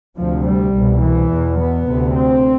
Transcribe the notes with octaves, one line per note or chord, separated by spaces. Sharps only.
D2 C3 F3
G3
C2 B2
E3
E2 B2
B3
D2 C3
C4